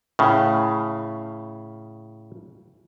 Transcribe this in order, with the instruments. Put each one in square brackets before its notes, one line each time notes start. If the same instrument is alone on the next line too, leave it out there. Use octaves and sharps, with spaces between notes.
[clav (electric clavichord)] A2 C#3